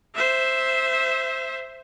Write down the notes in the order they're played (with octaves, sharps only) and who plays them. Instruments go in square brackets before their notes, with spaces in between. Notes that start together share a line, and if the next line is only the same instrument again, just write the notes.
[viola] C5 E5